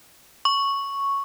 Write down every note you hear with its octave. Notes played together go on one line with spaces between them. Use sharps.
C#6